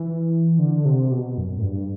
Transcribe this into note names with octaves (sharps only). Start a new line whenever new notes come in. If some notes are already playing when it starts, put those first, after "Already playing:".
Already playing: E3
D3
C3
B2
F#2
A2
G2